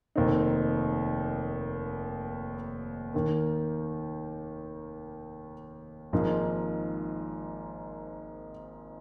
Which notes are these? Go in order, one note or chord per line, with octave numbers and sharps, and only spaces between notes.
F1 D#2 D#3 C4 D#4
D#2 D#3 A#3
G#1 G#2 F3 A#3 D#4